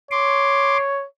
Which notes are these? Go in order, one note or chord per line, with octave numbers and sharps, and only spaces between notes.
C#5 C6 D6